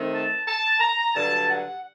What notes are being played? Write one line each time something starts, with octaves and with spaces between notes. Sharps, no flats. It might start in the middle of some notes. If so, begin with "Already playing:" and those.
Already playing: D#3 A3 C4
A5
A5
A#5
G2 D3 F#3 A5
F#5